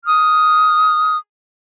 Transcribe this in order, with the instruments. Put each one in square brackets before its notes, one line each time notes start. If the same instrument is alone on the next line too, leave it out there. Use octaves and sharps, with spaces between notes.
[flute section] D#6 F6